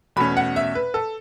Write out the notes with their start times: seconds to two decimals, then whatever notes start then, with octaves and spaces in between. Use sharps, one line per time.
0.16 E2 B2 A3 C#4 B5
0.37 F#5
0.56 E5
0.75 B4
0.94 A4